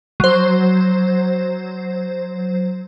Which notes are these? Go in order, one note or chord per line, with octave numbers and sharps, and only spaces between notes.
F#3 C5